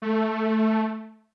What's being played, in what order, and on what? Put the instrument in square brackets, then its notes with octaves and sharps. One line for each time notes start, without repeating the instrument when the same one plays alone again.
[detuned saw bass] A3